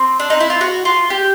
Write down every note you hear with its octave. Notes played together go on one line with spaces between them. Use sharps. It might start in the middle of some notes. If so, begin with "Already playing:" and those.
Already playing: C4
D4
D#4
E4
F4
F#4
F4
G4